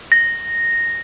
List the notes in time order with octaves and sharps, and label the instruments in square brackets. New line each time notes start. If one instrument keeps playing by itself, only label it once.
[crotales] A#6